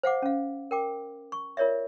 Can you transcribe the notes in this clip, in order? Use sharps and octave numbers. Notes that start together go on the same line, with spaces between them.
C5 F5 F#5 D6
C#4 F5
A#4 G5 D6
C#6
F4 A#4 C#5 D5 E5